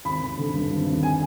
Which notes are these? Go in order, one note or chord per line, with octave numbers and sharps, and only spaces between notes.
G#1 B5
G#1
D3
G2
G#1
G#1
G#5